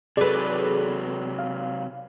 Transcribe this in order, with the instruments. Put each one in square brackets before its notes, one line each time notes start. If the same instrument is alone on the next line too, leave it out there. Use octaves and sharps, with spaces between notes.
[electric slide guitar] C3 F#3 [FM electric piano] G#4 A4 [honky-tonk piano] B4 D5
[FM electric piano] F5